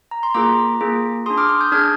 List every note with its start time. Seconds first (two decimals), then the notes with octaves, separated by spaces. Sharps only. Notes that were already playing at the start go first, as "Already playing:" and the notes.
0.11 A#5
0.23 C6
0.34 A#3 F4 G#4 A#5 D6
0.81 A#3 F4 G#4
1.26 D4 G#4 C6 D#6
1.38 D6 F6
1.49 D6 F6
1.61 D#6 G6
1.72 D4 G#4 F6 G#6